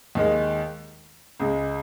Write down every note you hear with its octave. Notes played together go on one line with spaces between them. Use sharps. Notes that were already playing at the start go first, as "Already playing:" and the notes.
D#2 D#3 G#3
C#2 C#3 G#3